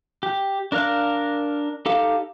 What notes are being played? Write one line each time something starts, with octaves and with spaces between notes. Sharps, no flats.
G4
D4 A#4 F5 F#6
D#4 G4 A4 F5